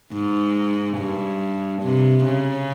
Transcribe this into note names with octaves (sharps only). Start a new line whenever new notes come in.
G#2
G2
C3
C#3